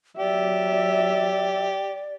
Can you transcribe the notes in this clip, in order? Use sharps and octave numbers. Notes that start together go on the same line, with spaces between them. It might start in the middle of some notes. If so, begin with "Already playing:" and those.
F#3 G4 D5 E5